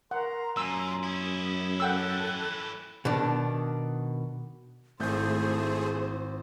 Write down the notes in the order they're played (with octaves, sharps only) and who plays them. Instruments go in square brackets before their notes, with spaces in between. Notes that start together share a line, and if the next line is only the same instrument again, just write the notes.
[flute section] A#4 A#5 C6 [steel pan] F#5
[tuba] F#2 [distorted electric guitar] A#2 [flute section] G#5 A#5 C6 [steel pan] E6
[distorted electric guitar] C#4 E4 [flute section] D#6
[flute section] A4 F#6 [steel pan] F#5 G5 E6
[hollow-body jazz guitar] B2 D#3 D4
[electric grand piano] G#1 G6 [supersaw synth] A3 G#4 [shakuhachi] E4 [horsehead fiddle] C5